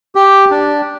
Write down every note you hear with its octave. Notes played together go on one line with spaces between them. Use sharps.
G4
D4